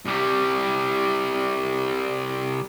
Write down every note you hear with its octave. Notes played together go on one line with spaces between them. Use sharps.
C2 G3